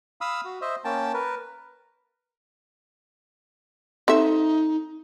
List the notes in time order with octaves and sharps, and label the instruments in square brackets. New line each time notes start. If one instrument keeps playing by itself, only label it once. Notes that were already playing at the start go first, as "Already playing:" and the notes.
[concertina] F5 B5 D#6 E6
F#4
C5 D#5 E5
A#3 C#4 G5 A5
A#4 B4
[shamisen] C4 A4 E5 [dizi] D#4